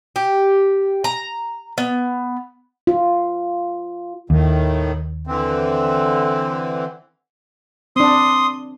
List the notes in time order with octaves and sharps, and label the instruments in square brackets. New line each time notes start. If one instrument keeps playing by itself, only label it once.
[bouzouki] G4
A#5
B3
[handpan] F4
[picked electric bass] D#2 [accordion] A2 D#3
[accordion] D3 E3 C4
[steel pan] C4 D4 [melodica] C6 D#6